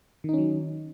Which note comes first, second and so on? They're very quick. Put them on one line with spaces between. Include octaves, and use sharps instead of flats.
D#3 D#4 C#4 F#3